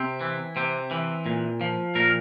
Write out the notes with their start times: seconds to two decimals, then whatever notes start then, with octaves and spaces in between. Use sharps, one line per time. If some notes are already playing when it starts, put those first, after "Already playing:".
Already playing: C3 C4
0.21 E3
0.56 C3 C4
0.91 E3
1.26 A#2
1.61 F3
1.95 A#2 A#4